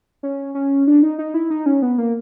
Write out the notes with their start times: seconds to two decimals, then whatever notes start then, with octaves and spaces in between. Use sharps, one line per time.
0.23 C#4
0.55 C#4
0.87 D4
1.03 D#4
1.19 D#4
1.34 E4
1.50 D#4
1.66 C#4
1.82 B3
1.98 A#3